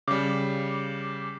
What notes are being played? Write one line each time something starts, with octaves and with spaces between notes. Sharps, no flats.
C#3 G3 D6